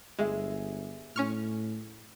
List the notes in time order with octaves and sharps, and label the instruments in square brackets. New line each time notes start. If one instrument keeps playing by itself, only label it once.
[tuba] G1 [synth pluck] G#3 [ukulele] G#4 E5
[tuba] A2 [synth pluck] C#4 C#6 F6